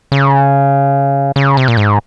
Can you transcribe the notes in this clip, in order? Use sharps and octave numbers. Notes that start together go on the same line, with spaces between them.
C#3
C#3
C3
A#2
G#2